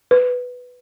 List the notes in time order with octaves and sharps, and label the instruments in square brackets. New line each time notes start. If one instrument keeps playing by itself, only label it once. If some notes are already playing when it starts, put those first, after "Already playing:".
[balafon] B4